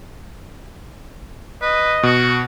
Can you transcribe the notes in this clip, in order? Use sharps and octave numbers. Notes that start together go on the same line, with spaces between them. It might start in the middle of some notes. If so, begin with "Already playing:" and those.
B4 D#5
B2 F#4